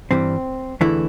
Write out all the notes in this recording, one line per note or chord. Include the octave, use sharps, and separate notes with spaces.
G2 E3 G3 C4
E2 D3 E3 A3 E4